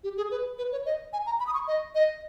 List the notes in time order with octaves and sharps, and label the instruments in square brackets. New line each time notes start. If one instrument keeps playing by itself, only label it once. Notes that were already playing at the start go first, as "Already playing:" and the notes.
[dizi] G4
G#4
B4
B4
C#5
D#5
G#5
A#5
B5
D#6
C#6
D#5
D#5